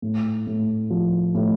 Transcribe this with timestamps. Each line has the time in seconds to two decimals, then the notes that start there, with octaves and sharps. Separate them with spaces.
0.02 A2
0.47 A2
0.90 F3
1.35 A2